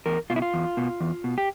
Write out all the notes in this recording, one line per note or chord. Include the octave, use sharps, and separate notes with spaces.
E2 A#4
B2 F4
E4
F4
E2
B2
E2
B2
G4